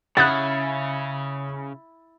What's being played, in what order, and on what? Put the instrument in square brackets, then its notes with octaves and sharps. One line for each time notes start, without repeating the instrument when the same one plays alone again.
[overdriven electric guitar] C#3 [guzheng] E4 [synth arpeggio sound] F#5 D#6 F#6 [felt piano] A6